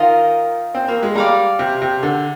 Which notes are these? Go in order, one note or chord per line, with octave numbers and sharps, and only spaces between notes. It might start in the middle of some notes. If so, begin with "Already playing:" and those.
Already playing: D#3 F4 A#4 D#5
C4
A#3
G#3
G3 D5 F5 A#5
C3
C3
D3